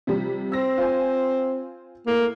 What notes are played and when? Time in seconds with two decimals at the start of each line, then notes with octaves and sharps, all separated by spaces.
0.07 C3 F3 G3
0.52 C4 E6 A#6
0.78 F4 C5 G#5
2.07 A2 A#3